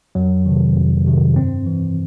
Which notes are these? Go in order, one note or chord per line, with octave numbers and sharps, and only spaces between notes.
F2 F#3
C3 D#3
F2
C3 D#3
G2 C4
E3